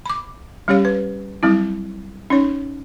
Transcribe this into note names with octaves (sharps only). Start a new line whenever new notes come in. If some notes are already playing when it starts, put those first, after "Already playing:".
B5 D6
G3 C#4 G4 C#5 F5
B4
F#3 G3 C4 E4
C#4 D#4 C#5